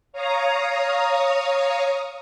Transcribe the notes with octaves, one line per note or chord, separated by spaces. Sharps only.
C#5 F5 A#5 D#6